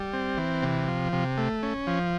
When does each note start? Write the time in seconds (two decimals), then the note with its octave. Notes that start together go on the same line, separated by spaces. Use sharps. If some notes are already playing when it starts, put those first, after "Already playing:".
Already playing: G3
0.13 C4
0.37 E3
0.62 C3
0.88 F3
1.13 C3
1.37 A3
1.63 C#4
1.87 F3